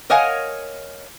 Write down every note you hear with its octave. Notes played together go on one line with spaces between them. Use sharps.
A#4 C#5 D#5 F5 F#5 G#5